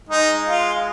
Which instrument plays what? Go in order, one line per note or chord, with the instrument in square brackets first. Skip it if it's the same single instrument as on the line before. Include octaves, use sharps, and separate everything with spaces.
[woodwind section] G#3 [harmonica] D#4
[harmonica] F4